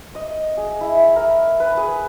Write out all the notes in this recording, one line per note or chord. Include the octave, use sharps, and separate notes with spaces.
D#5
G#4
E4
A#4
B4
G#4